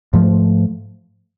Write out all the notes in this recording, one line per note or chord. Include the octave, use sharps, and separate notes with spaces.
G#2 F3 A3